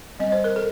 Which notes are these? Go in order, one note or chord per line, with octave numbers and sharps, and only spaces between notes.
G3 C4 D#5
C5
A#4
A4